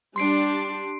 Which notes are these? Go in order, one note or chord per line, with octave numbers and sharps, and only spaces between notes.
G3 D4 G4 C6 C7 D7